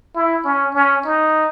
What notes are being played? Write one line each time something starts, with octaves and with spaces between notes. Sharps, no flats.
E4
C#4
C#4
D#4